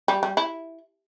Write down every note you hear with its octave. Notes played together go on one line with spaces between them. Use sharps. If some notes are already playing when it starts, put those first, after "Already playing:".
G3
G3
E4